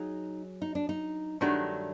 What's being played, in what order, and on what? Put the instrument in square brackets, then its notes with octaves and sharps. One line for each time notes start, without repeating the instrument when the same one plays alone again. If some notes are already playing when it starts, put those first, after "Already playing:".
Already playing: [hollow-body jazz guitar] F#3 G#4 [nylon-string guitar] D#4
[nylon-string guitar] D#4
D4
D#4
[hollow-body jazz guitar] G2 D#3 F#3 A3 [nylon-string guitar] D4